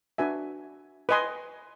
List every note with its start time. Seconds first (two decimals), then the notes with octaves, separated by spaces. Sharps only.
0.18 D4 F#4 B4 E5 G#5
1.09 B4 D#5 G#5 C6